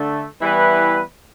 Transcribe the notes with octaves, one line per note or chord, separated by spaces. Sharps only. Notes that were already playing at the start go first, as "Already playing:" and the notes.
Already playing: D3 A3
E3 G3 B3 E4 B4